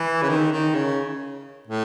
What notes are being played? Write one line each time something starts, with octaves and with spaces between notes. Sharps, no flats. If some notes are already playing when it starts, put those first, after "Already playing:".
Already playing: E3
C#3
D#3
D#3
C#3
A2